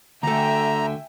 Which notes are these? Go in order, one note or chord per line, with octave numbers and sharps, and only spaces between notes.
D2 D3 A3 E5 G5 G#5 A#5